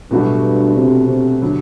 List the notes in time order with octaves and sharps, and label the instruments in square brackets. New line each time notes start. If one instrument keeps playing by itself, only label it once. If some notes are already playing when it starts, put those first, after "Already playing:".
[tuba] G2 [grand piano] B2 F#3 A3 D4 F#4
[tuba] C3
C3
[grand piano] D3 F#3